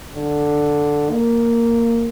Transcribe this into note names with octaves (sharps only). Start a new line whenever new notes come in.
D3
A#3